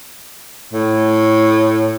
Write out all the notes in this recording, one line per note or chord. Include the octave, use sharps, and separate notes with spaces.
A2